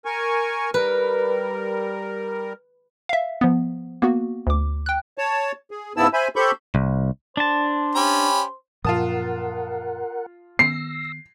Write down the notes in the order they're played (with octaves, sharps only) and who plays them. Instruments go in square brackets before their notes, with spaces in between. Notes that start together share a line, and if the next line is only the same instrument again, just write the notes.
[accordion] A#4 G#5 C#6
[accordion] G3 A#4 [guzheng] B4
[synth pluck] E5 F5
F3 B3
A#3 B3 F#4
D2 D6
G5 F#6
[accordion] C#5 A5
G#4
G#2 C#3 B3 E4 A5 E6
C5 E5 G#5 B5
G4 A4 C5 B5 C#6 G6
[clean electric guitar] C2
[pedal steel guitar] D4 A5 [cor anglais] C5
[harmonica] C#4 G4 B5
[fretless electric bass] F#2 A#2 F3 [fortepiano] F4 A5 D#6 [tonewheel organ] A#4 F#5
[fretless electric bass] D#3 B3 [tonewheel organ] E6 A#6 [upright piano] C7